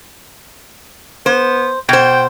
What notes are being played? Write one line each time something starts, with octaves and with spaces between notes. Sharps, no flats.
B3 C5
B2 C5 G5